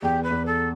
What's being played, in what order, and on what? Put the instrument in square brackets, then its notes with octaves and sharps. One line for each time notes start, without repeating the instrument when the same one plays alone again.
[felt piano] E2 [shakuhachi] G4
[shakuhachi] B4
[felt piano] E2
[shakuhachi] A4